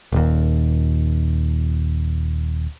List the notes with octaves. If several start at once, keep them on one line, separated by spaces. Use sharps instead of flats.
D#1 D#2